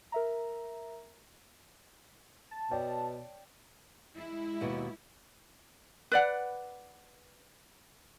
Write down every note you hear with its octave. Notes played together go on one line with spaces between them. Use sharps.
A#4 E5 A#5
A5
B2 C#5 D5 G5
G#3 E4
D#2 B2
B4 D5 F#5